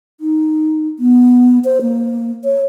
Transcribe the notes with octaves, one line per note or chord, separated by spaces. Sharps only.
D#4
B3
C5
A#3
C#5